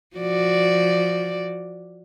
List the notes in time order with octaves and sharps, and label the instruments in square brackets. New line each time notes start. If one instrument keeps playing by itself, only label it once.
[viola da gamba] F3 F#4 D5